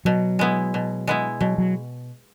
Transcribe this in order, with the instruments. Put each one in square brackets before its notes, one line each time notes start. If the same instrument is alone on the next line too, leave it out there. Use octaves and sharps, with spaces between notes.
[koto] B2 [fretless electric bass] F#3
[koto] G#3 B3 E4
B2
G#3 B3 E4
[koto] B2 [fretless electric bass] F#3
[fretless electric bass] F#3